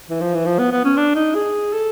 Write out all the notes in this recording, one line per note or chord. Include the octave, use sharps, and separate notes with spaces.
E3
F3
E3
F3
B3
B3
C#4
D4
D#4
G#4
A4